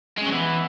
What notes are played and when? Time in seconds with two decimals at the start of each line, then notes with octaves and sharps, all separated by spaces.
0.17 G#3 C#4
0.26 F#3
0.32 E3 B3